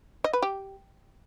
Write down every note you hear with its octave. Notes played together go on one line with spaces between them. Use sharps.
D#5
B4
G4